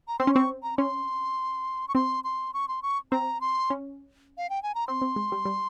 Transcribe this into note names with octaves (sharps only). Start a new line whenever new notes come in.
A#5
C4 C6
C#4
C4 C#6
A#5
C#4 C6
C#6
C4 C6
C6
C#6
C6
C#6
C4 A#5
C6
C#4
F5
G5
G#5
A#5
C4 C6
C4
G#3
G3
G3